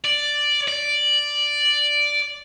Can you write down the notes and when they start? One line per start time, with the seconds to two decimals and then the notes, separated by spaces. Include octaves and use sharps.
0.04 D5
0.68 D5